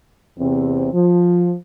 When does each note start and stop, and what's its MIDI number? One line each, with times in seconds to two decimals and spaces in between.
0.39 0.89 40
0.39 0.89 48
0.39 0.89 60
0.94 1.53 53